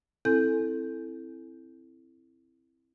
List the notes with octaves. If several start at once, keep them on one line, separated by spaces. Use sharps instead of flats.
C4 E4 A4 G#5 G6